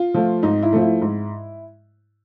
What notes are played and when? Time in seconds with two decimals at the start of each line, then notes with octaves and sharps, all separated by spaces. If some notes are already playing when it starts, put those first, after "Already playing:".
Already playing: F4
0.14 F3 A3
0.43 G#2 D#4
0.63 E4
0.73 F3 A3
0.82 E4
1.02 G#2